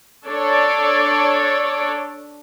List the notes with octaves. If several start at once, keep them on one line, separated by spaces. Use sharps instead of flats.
D4 A4 C#5 D5